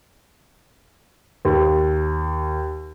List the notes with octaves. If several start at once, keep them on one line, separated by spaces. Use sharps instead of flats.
D#2